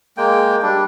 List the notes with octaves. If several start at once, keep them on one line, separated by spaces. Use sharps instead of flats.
G#3 A#3 G5
G3 D4